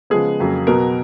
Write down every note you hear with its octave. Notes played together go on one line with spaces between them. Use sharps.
C#3 F3 G#3 B3 G#4
F2 C#3 F#3 A#3
B2 F#3 B3 A#4